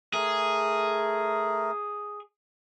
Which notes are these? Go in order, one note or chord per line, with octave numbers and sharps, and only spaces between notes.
A3 G#4 A#4